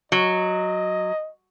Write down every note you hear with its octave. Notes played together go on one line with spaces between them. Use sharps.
F#3 D#5